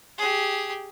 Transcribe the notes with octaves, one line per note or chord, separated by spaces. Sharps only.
G4 G#4